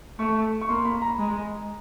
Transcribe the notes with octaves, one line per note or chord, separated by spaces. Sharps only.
A3 C#6
C#6
A#3 C6
B5
A#5
G#3